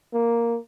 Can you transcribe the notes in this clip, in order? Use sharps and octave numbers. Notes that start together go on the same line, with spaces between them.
A#3